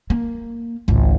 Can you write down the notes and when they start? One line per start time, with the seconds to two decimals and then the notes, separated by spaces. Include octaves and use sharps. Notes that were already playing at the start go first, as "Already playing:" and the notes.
0.10 A#3
0.88 G#1 C#2